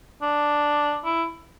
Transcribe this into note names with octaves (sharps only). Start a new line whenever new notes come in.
D4
E4